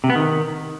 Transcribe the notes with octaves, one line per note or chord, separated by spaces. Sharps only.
C3
B3
D#3